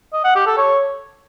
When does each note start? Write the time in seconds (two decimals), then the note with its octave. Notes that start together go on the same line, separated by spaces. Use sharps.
0.13 D#5
0.24 F#5
0.35 G4
0.47 A4
0.58 C#5